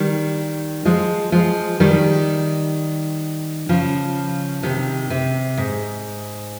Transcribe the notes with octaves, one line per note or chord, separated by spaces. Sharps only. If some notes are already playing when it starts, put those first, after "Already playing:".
Already playing: D#3 G3
F3 G#3
F3 G#3
D#3 G3
C#3 F3
C3 D#3
C3
G#2